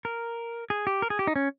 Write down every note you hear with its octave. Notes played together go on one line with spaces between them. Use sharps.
A#4
G#4
G4
A#4
G#4
G4
D#4
C#4